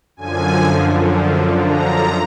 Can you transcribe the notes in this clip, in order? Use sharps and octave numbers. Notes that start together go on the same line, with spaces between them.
F#2 D3 F3 G#5
A#5